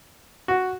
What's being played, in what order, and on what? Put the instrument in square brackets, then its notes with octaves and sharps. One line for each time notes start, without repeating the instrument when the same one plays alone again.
[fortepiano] F#4